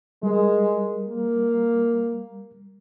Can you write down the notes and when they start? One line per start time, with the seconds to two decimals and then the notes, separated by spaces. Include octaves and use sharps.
0.23 G3 G#3 A#4
1.08 A#3